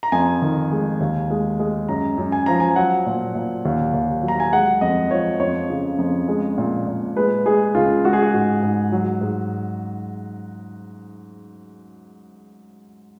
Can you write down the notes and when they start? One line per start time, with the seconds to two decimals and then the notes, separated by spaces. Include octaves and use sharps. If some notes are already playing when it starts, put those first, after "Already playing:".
0.03 A#5
0.12 F2 G#5
0.42 D#3
0.72 G#3
1.00 D#2
1.30 G#3
1.60 G#3
1.89 F#2 A#5
2.18 F#2
2.32 G#5
2.46 F3 A#5
2.60 G#5
2.76 F#3 F#5
3.06 A#2
3.35 A#2
3.65 D#2
3.94 D#2
4.23 F#3
4.28 A#5
4.40 G#5
4.52 G#3 F#5
4.81 F2 D#5
5.11 F3 C#5
5.40 F2 C#5
5.70 C#3
5.98 F2
6.28 G#3
6.58 A#2
6.87 A#2
7.17 G#3 B4
7.46 G#3 G#4
7.75 C#2 F4
8.04 G#3 F#4
8.13 G#4
8.22 F#4
8.34 G#2
8.63 G#2
8.92 F#3
9.21 G#2